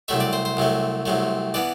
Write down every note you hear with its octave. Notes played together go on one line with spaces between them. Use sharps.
C2 C3 F#3 A3 E5
D5
C5
C5
C2 C3 F#3 A3
C2 C3 F#3 A3
E3 B3 D5